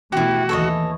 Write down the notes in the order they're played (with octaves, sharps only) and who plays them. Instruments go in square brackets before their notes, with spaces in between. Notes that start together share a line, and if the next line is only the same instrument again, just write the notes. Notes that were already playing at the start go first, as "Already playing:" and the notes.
[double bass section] B2 E3 A3 [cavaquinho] E4 G4 [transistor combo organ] F#4
[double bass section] D#2 E3 [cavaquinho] A4 C#5 D#5